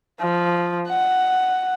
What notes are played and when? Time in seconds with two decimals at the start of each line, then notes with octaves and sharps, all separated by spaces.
0.20 F3
0.88 F#5